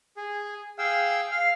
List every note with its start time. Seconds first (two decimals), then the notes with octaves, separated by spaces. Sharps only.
0.17 G#4
0.79 G#4 F5 G5 E6
1.32 F5 F6